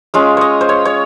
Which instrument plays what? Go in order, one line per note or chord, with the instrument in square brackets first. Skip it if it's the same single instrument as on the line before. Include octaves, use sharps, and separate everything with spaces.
[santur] G#3 C#4 F4 F5
C#5 D#5
C5
C#5
C#5